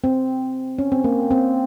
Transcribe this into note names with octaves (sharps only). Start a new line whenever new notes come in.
C4
C#4
C4
A#3
C4